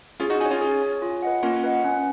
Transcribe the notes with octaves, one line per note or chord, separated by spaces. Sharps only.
C#4 F4 G#4
D#4 F#4
D#4 F#4 C#5 G#5
C#4 F4
G#4
C#5 G#5
F4
B4 D#5 F#5
A#3 C#4 F4
B4 D#5 F#5
C#4